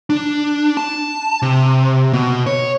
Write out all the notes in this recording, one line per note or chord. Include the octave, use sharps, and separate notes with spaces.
D4
A5
C3
B2
C#5